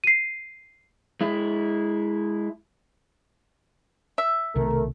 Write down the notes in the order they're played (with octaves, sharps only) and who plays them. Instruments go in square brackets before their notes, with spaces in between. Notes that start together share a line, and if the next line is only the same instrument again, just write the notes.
[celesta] C7 D#7
[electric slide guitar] G#3 E4
[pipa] E5
[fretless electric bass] B1 C3 D#3 [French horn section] A3 A#4